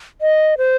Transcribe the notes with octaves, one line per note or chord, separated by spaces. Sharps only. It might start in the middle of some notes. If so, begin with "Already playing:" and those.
D#5
C5